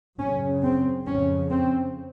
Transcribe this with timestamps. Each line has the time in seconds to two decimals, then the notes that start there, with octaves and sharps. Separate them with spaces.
0.20 F#2 C#3 C#4
0.64 C4
1.06 F2 C#3 C#4
1.51 C4